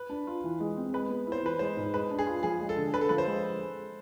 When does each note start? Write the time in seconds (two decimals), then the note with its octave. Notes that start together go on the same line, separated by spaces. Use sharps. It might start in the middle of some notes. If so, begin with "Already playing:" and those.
Already playing: B4
0.10 D4
0.27 F4
0.44 E3
0.60 G#3
0.77 C4
0.94 G#3 B4
1.10 B3
1.27 E4 C5
1.43 E3 B4
1.59 G#3 C5
1.77 G#2
1.94 G#3 B4
2.11 D4
2.19 G#4
2.27 F4
2.43 F3 G#4
2.61 G#3
2.69 A4
2.77 D3
2.93 D3 B4
3.01 A4
3.09 F3 B4
3.18 C5
3.27 G#3